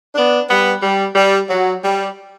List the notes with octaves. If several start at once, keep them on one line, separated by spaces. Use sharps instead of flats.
B3 D4
G3 B3
G3
G3
F#3
G3